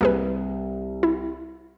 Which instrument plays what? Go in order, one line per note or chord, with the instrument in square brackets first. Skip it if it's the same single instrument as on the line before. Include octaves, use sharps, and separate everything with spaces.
[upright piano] C2 [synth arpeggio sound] A#3 G#4 B4
[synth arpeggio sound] E4